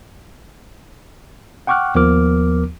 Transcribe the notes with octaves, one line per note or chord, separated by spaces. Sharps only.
F#5 G5 C#6 D6 F6 F#6
D#2 F3 B3 A#4 D6 F6